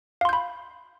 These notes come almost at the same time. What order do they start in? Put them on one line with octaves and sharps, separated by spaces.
F5 C6 G6 B5